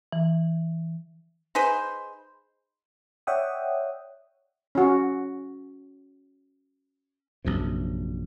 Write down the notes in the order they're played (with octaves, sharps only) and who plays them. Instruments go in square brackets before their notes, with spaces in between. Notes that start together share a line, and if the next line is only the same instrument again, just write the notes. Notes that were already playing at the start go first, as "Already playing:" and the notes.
[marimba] E3
[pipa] D#4 G#4 B4 C5
[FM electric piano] C#5 D5 E5 F#5 G5 D#6
[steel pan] C#4 F#4
[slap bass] A#1 F#2 C3